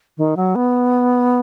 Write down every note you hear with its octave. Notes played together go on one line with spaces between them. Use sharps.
D#3
F#3
B3